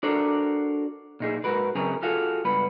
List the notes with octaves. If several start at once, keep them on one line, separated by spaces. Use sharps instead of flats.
D4 F#4 A4 A#4 C5 D5
A#2 D#4 G#4
G#2 F#4 A#4 B4
F#2 C#3 C4 G#4 A#4
F4 F#4 G#4 A4 F5
C#2 G2 B3 B4 B5